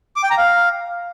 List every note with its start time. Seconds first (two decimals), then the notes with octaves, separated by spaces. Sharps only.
0.16 D6
0.23 G5
0.30 A#5
0.38 F5